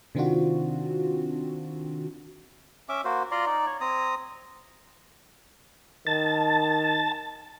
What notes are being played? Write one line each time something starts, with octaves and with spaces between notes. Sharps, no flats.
C3 D#3 C4 D4 F4 F#4
C#4 E5 D6
A#3 F#4 C5
F4 D5 A#5 C6
D#4 D5
C#5
C4 A#5 D#6
D#3 A5